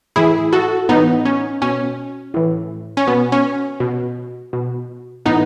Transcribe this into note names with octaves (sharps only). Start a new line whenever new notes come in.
A2 E3 E4 G#4
F#4 A4
A2 E3 B3 D#4
C#4
B2 C#4
A2 E3
C#4
B2 B3
C#4
B2
B2
A2 E3 B3 D#4